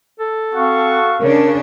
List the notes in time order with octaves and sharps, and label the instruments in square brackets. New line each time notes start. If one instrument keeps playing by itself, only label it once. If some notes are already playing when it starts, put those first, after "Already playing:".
[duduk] A4
[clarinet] C4 [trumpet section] F#4 F5 C#6
[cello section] C#3 D4 [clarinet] A#4